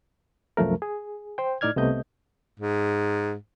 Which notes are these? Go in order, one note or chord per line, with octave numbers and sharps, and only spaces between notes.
C2 F#2 F3 A3 A#4
G#4
C5 G5
A2 D#4 D5 F6 G#6
C2 C3 A3 B3 D#5 G6
G#2